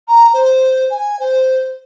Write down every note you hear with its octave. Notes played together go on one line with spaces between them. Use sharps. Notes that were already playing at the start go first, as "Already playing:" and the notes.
A#5
C5
G#5
C5